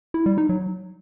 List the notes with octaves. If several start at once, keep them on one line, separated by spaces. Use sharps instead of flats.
E4
G3
D#4
F#3